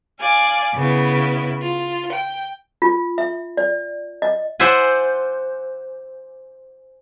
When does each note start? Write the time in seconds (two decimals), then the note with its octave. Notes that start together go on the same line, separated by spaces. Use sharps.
0.20 D5 F5 G#5
0.75 C#3 B3 E4
1.61 F4
2.11 G5
2.82 F4
3.18 E5
3.57 D5
4.22 D#5
4.60 C5 D5 E5 F#5 G#5